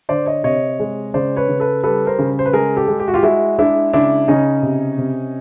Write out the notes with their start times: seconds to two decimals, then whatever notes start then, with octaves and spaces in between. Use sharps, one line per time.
0.09 D3 C5 D5
0.26 C#5 D#5
0.43 C3 C#5 D#5
0.80 G#3
1.14 C#3 C5 D5
1.37 B4 C#5
1.49 C#3
1.60 A4 B4
1.83 G3 A4 B4
2.07 A#4 C5
2.19 C#3
2.39 C5
2.46 B4
2.53 G#3 G#4 A#4
2.77 G4 A4
2.88 G#3
3.00 G4
3.08 F#4
3.14 F4 G4
3.23 G#3 E4 F#4
3.58 G#3 D4 E4
3.93 C#3 D4 E4
4.28 C#3 C#4 D#4
4.62 C3
4.98 C3